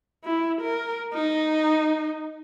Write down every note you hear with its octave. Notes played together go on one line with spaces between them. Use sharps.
E4
A#4
D#4